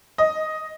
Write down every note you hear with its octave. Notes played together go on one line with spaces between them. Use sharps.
D#5